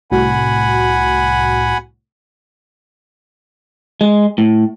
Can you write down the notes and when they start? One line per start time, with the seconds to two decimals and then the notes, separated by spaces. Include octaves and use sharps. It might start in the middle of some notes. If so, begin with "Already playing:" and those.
0.11 C2 A2 F#4 F#5 G#5 B5
4.01 G#3
4.38 A2